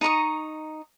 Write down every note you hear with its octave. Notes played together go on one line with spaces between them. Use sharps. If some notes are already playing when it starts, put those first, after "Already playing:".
D#4 A#5 C#6 D#6